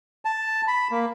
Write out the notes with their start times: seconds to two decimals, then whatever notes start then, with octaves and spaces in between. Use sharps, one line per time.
0.25 A5
0.68 B5
0.91 A#3